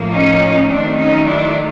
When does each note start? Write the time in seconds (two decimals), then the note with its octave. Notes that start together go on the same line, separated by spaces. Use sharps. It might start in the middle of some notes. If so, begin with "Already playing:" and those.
Already playing: A2 F3 A#3
0.11 C#4 D#4
0.68 D#3 F#3 A3 C4 D4
0.97 C#4 D#4
1.26 D4 E4